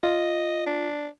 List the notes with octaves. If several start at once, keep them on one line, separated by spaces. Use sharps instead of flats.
F4 D#5
D4